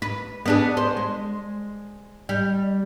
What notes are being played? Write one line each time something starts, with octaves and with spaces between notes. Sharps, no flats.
B4
B3 D4 G#4
C5
G#3
G3